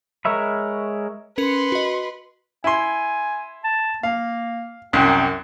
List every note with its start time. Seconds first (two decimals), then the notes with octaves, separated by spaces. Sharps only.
0.25 G#3 A#4 C#5 E5 B5
1.38 C#4 A#4 B4 C6 C#7
1.72 F#4 D#5
2.64 E4 G#5 C6
3.64 A5
4.03 A#3 F5
4.93 C2 F#2 G5